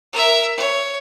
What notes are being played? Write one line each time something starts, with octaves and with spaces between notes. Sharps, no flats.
A#4 E5
C#5